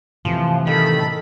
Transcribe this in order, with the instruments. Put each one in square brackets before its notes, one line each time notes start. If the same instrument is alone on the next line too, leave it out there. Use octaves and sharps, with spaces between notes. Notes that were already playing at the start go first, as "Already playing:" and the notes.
[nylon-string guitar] A2 C3 E3 [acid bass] F3
[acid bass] D#3 [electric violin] A4 B5